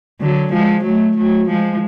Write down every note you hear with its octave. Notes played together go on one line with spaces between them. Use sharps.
D3 F#3
F3 G#3
F#3 A3
F#3 A3
F3 G#3